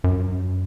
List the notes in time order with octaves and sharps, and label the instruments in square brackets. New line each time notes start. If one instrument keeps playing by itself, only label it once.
[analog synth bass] F#2